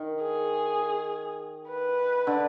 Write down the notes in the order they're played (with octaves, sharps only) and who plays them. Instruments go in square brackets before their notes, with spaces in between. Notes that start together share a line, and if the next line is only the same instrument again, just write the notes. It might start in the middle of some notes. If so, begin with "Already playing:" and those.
Already playing: [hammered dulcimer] D#3
[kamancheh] G#4
B4
[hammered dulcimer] D3